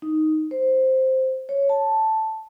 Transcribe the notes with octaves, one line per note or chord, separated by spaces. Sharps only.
D#4
C5
C#5
A5